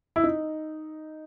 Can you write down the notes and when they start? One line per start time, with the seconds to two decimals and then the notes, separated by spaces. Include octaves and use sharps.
0.16 E4
0.24 D#4